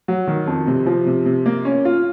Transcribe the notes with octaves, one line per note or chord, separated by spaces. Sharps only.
F#3
D#3
F2
C3
F3
C3
C3
A#3
C#4
F4